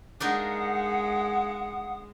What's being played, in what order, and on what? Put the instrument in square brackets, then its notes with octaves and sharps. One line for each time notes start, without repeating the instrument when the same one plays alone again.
[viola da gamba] G#3 [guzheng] D4 D#4 A#4 [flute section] F5 F#5 [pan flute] D#6